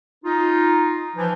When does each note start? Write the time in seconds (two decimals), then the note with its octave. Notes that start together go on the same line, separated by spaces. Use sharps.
0.24 D#4 F4
1.16 E3 F3